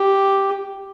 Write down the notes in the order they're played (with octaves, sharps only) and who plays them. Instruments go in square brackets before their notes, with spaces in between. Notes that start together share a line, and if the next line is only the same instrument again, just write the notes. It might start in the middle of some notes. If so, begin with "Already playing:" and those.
Already playing: [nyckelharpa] G4